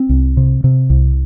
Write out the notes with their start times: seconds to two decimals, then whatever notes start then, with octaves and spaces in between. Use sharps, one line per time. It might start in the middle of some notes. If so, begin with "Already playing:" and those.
Already playing: C4
0.09 C2
0.37 C3
0.64 C3
0.90 C2